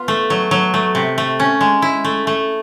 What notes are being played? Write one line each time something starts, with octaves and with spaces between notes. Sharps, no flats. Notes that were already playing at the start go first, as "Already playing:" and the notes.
Already playing: B3 F4
A3
F#3
F#3
A3
C3
A3
C#4
G#3
E4
A3
A3